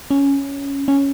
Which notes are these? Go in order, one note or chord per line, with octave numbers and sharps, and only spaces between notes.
C#4
C#4